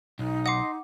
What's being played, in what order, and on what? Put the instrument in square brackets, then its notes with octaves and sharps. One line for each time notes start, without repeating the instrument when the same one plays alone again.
[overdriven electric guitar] B1 [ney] D#4
[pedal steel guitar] D#5 C6 [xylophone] F#5 D6